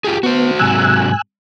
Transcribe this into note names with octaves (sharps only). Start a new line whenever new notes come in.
F4 G4 G#4
B3 F#4 C5
G#2 C3 F#3 G#5 E6 F#6